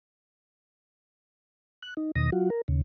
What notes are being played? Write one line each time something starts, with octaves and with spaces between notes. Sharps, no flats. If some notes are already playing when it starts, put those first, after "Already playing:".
F#6
D#4
E2 B2 D#3 D#6 A#6
F#3 F4 F#4
A#4
D#2 C#3